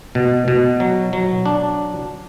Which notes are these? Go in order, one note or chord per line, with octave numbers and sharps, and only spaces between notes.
B2
B2
F#3
F#3
D4